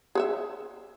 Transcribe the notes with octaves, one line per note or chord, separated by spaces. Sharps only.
G#4 C#5 E5